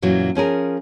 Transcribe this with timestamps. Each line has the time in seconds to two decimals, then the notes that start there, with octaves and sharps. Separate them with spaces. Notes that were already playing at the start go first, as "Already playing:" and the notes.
0.02 F#2 A#2 E3 F#3
0.35 F3 C#4 G#4 A#4